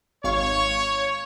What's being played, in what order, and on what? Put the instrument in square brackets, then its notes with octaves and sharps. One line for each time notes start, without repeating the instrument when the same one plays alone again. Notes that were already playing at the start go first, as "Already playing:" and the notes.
[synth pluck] G#1 F5 C#6 [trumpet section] C#5